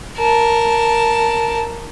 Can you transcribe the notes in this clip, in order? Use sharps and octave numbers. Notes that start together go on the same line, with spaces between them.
A#4 A5